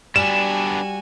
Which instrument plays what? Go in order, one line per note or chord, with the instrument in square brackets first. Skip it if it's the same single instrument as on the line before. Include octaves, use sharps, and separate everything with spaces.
[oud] G3 [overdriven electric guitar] B3 D4 [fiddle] F#4 G#5 [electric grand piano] E7